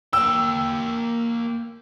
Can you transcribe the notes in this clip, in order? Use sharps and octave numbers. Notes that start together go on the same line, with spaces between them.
A#3 G5 E6